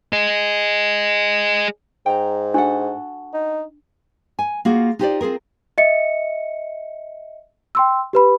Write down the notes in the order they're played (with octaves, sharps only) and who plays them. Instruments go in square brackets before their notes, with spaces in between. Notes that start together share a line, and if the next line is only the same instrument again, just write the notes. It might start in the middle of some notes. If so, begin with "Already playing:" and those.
[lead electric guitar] G#4 D#5
[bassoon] G#2 [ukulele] G5 A#5
[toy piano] D4 [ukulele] F#4 A4 F#5
[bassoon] D#4
[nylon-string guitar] G#5
A#3 F4 F#4 G#4
D#4 F4 G4 A4 C5 D5
C4 F4 G#4 A#4
[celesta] D#5 E5 C#7
G5 C6 E6
G4 B4 B5